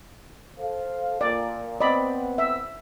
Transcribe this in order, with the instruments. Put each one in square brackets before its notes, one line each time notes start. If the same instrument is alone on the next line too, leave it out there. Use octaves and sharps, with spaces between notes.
[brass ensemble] A4 C5 F5
[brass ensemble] A#2 [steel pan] D5
[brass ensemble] B3 C4 [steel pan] D5 D#5 B5
[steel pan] E5